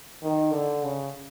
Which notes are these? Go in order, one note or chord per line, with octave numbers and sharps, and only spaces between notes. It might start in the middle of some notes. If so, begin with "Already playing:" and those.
D#3
D3
C#3